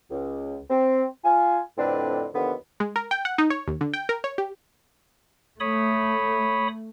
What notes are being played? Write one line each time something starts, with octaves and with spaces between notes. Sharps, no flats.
C#2
C4
F4 G#5
F2 A2 D3 C4 D4 B4
D#2 D3 F3 B3
G#3
A#4
G5
F#5
D#4
C#5
D#2
D3
G5
A#4
C#5
G4
A3 C#5 B5 D#6